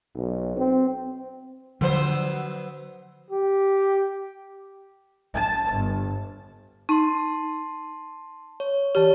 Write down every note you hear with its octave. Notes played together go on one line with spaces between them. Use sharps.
B1
C4
D3 F3 F#3 B3 C5
G4
A5
G1
D#4 A5 C6
C#5
E3 G4 C#5 A5